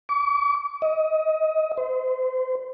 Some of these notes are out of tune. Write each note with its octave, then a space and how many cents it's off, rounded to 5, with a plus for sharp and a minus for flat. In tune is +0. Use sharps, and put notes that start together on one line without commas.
D6 -45
D#5 +25
C5 -30